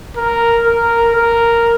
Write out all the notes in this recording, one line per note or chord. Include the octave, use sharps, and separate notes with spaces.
A#4
A#4
A#4